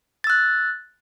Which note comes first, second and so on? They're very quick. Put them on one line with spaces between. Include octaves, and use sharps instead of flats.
A6 E6 F#6